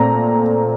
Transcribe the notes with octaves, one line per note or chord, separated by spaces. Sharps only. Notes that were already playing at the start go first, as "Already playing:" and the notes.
Already playing: A#2 A3 C4 A#5